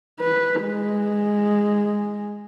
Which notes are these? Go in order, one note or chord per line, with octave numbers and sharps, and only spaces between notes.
B4
G#3